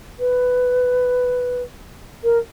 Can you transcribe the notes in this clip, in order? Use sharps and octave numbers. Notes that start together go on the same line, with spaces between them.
B4
A#4